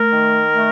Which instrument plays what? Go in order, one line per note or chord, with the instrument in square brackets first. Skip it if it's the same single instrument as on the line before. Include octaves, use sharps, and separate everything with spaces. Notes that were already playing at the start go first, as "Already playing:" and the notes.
Already playing: [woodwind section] A3 A#4
D#3
A3